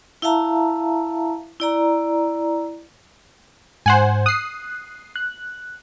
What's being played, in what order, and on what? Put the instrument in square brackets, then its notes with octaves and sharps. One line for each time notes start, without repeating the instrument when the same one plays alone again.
[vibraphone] E4 E5 F5 A5 A#5
E4 D5 A#5
[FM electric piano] G#2 [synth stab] C5 F#5 G#5
[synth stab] D#6 C7 [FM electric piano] F#6
[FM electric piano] F#6